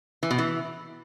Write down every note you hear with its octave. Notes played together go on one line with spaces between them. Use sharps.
E3
B2
E3